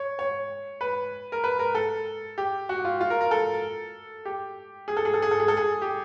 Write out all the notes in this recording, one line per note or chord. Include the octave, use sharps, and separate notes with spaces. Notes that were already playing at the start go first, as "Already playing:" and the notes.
Already playing: C#5
C#5
B4
A#4
B4
A#4
A4
G4
F#4
F4
F4
A#4
A#4
A4
G4
G#4
A4
G#4
A4
G#4
A4
G#4
A4
G#4
G4